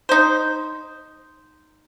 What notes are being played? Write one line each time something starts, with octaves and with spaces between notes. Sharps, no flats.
D#4 C5